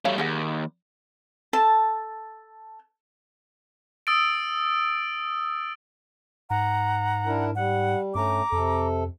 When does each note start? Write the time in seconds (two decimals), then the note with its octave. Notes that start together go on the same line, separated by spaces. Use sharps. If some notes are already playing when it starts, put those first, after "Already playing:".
0.05 F#3 G3 A3 C#5 F5
0.18 D#2 G3 G#4 F#5
1.53 A4 A5
4.07 D#6 E6 A6 D7
6.50 G#2 F#5 A#5
7.26 D4 E4 A#4
7.55 G3 F#5
8.15 G2 A3 C#4 A#5 D6
8.52 F2 C3 A4